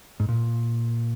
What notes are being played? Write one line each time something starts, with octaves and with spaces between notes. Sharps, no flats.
G#2
A#2